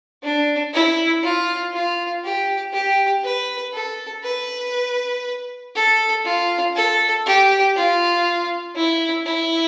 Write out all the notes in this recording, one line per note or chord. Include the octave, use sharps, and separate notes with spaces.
D4
E4
F4
F4
G4
G4
B4
A4
B4
A4
F4
A4
G4
F4
E4
E4